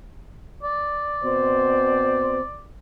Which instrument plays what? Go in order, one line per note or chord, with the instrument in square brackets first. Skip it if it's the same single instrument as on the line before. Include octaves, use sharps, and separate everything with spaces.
[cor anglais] D5
[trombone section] B2 C4 C5